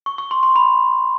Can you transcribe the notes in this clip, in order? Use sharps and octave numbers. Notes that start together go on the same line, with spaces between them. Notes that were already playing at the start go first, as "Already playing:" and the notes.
C#6
C#6
C6
C6
B5